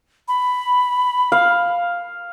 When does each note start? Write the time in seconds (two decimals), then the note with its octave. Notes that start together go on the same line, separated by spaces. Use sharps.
0.28 B5
1.32 F5